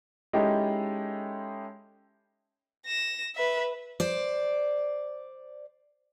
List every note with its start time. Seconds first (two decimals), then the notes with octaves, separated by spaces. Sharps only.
0.33 G#3 C#4 D#4 E4 G4 A4
2.86 A#6 E7
3.36 B4 E5
4.00 C5 D5